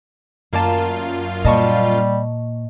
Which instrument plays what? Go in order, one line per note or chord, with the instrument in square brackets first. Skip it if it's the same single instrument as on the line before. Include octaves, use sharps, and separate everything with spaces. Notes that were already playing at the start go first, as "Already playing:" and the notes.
[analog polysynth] F#2 F4 [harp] A#3 D5 A5
[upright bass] A#2 [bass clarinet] G3 [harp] D#5 A5 C#6